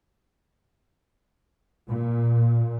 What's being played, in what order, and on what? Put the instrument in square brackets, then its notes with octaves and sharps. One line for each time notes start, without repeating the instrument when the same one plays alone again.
[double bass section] A#2